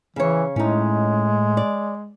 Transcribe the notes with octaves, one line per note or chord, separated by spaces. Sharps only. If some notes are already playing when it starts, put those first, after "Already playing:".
C#3 E3 C#5
A2 G#3 C#4 D#4
D5